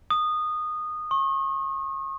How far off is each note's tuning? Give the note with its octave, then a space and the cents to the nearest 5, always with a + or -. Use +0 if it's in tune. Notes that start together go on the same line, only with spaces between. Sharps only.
D#6 -20
C#6 -35